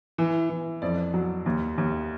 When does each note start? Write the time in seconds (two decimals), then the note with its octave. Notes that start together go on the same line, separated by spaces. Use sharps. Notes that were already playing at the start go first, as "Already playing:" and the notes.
0.18 E3
0.49 E3
0.82 F2 D5
1.14 F#3
1.46 D#2
1.78 D#2